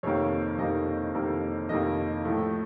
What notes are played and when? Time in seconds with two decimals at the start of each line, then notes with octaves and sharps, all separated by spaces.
0.03 F2 C3 D#3 A#3 C#5
0.58 F2 C3 D#3 A#3 D#5
1.14 F2 C3 D#3 A#3
1.69 F2 C3 D#3 A#3 D#5
2.25 A2 F3 A3